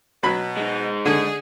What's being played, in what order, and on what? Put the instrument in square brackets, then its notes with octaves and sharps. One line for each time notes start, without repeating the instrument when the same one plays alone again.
[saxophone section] B2 [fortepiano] F#3 B5
[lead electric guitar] G#3 D#4
[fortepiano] D3 [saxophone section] G#4